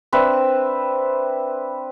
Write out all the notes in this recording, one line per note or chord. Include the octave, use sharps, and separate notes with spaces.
C4 D4 B4 E5